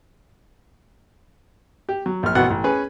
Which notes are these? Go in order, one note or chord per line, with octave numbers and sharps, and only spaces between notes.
G4
F#3
A#1 F6
A1 B2 B3 F#5
A1
C#4 G#4 B4